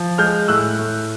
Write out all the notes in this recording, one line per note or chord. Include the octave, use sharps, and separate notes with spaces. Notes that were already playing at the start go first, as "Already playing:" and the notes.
Already playing: F3
G#3 F6 G6
A2 E6 F#6
A2